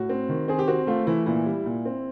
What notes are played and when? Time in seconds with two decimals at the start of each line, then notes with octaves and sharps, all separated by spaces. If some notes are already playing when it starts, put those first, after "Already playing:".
Already playing: A2 F#4
0.09 C4
0.29 D#3
0.48 C4 G#4
0.59 G4
0.68 C4 F#4
0.87 A3 F4
1.07 E3 E4
1.26 A#2 E4
1.46 G3
1.66 A#2
1.85 C4